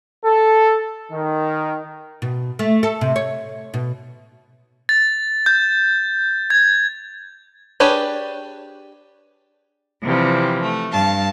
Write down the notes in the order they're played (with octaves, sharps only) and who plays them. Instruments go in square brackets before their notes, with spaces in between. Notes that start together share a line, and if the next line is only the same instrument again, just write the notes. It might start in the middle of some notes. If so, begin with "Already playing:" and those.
[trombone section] A4
D#3
[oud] B2
A3
A4
C3
C#5
B2
[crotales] A6
G6
G#6
[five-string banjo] D4 G4 G#4 B4 C#5
[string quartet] C3 E3 F3 G3
A3
G2 F5 A5